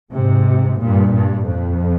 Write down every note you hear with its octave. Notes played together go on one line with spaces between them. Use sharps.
G#2 C3
G2 A#2
G2
F2